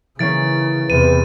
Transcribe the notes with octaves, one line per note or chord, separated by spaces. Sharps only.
C#3 E3 A#3 C#4 A6 D7
E2 C3 B4 D#7